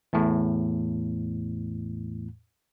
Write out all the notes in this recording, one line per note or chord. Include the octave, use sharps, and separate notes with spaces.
E2 A2